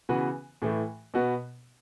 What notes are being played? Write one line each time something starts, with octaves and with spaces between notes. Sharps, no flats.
C#3 E3 B3 F#4 B4
A2 E3 A3
B2 B3 F#4